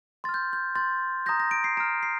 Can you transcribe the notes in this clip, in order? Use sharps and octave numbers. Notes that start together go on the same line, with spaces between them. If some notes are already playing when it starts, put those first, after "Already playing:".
C6 F6 A6
G6
G6
C6 G6 A6
A#5 D#6 G6 A#6
A#6
D7
C7
A#5 F6 D7
C7